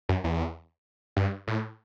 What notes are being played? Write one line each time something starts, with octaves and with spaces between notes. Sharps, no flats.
F#2
E2
G2
A2